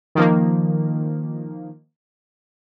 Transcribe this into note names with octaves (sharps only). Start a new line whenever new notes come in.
D#3 F3 A#3